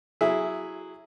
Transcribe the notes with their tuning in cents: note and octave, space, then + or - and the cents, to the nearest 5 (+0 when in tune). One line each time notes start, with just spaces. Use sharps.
F#3 +0 E4 +0 G#4 +0